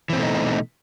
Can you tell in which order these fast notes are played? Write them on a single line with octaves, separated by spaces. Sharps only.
E3 C4 B2 A3 D#4